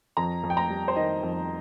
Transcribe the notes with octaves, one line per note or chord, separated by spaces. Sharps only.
F2 A#5
F2
G5
A#5
G3
C5
D#3 D#5
F2